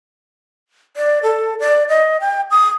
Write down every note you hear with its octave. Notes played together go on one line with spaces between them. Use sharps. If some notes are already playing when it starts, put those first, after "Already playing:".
D5
A4
D5
D#5
G5
D#6